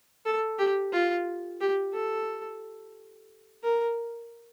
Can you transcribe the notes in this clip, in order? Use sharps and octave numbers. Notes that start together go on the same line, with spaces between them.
A4
G4
F4
G4
A4
A#4